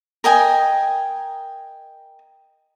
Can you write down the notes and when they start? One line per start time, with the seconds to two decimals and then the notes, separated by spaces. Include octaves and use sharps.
0.24 A#4 D#5 G5 G#5